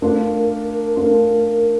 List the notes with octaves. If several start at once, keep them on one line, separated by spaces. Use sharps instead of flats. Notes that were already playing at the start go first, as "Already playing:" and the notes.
A3 D4 F4 A#4
A3 D4 F4